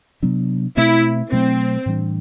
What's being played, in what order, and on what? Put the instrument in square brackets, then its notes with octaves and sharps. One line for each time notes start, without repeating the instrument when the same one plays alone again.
[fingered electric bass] C3 F#3 B3 D4
[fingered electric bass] B2 A3 C4 [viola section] E4
[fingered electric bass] B2 F#3 A3 [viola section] C4
[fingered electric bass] A2 E3 G3 D4